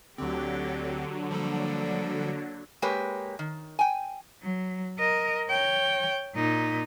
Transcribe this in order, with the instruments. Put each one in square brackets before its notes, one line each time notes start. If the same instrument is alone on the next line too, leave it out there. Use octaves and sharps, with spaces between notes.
[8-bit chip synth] D2 C4 [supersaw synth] D3 F#3 [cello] G4
[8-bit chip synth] F3 G3 A4 [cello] A#3 D4
[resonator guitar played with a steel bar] G#3 A#3 G4 B4 C#5
D#3
G5 G#5
[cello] F#3
A#4 D#5
C#5 G5
A#2 D#4